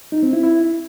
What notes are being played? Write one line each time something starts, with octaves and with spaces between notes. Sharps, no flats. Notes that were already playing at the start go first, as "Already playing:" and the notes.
D#4
C4
E4
E4